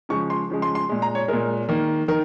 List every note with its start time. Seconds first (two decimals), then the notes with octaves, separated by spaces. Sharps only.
0.09 C#3 F3 G#3 C#6
0.30 C6
0.50 C#3 F3 G#3
0.62 C6
0.75 C6
0.89 A#2 G#3
1.02 A#5
1.15 C#5
1.28 A#2 G#3 A#4
1.69 D#3 A#3
2.08 D#3 A#4